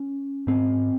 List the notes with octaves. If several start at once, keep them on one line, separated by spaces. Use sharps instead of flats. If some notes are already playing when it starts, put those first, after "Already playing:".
Already playing: C#4
G#2 C4